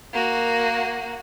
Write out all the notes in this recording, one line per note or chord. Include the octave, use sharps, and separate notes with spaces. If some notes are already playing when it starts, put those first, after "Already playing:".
A#3 F#4